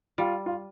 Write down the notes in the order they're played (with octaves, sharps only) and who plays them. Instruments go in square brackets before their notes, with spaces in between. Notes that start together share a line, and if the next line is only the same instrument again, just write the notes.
[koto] G3 [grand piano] F4
[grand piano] F4